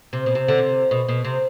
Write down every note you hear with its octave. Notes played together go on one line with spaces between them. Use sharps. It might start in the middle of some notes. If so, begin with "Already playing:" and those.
C3
B2
C3
D3
C3
B2
B2
C3